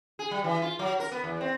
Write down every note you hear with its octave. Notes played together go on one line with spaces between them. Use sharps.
G#4
G3
E3
F4
F#3
A#4
B3
E2
C4